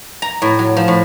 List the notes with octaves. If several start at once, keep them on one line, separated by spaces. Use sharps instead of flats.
A#5
A2
F#3
F3
A2